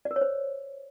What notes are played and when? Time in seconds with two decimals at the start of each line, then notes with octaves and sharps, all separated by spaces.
0.05 D5
0.11 A#4
0.16 C#5
0.21 C5